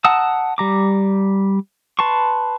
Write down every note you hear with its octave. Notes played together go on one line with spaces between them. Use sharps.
F#5 A5 A#5 D#6 E6
G3 A#5 D6
B4 A5 C6 C#6